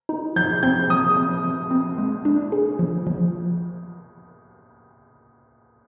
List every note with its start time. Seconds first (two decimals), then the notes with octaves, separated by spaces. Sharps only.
0.09 D#4
0.36 F3 G6
0.63 C4 G6
0.90 F3 D#6
1.17 C4
1.44 F3
1.71 C4
1.98 G#3
2.25 D4
2.52 G#4
2.79 F3
3.07 F3